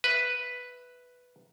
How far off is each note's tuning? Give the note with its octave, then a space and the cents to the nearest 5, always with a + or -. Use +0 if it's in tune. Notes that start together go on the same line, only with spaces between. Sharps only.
B4 +0 E5 +0